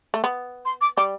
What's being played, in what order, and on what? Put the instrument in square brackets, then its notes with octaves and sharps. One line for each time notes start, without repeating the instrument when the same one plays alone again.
[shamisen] A3
B3
[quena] C6
D6
[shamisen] G3 [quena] D6